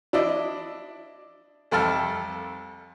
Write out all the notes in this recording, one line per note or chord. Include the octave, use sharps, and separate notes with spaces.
D4 E4 D5 D#5
C2 F2 A4 A5 F6